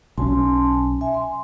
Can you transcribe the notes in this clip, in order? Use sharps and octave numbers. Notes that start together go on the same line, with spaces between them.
B1 E3 C#4 G#5 A5 C6
E5 G#5
C6